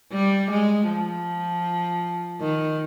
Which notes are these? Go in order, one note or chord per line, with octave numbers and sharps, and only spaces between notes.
G3
G#3
F3
D#3